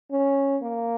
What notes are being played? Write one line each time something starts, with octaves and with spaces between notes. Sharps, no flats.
C#4
A#3